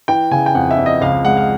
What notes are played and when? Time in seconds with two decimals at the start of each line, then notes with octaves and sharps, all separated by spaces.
0.08 E3 G5
0.31 C#3 G#5
0.46 G5
0.55 F2 F#5
0.71 E5
0.78 F2
0.86 D#5
1.01 C#2 F5
1.25 G#3 F#5
1.37 F5